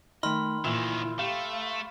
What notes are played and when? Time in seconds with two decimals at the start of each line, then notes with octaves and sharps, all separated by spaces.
0.23 D#3 A3 D#5 B5 C6 F6
0.65 D2 A#2 D#3 E3 E4 E6
1.19 A3 G4 F5